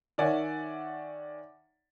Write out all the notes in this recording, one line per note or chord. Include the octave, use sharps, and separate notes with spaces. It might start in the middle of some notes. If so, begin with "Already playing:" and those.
D#3 C#5 D5 E5 F#5 G#5